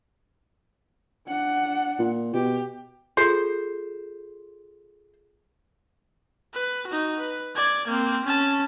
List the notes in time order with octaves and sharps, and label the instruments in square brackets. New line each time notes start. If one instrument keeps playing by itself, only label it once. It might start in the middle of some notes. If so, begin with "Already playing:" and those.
[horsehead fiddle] D4 F#5
[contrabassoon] A#2
[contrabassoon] B2 [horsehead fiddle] G4
[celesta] F4 G#4 A4 [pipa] C5
[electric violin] B4
D#4 F#4
B4
D5 G#6
A#3 C4
C#4 A5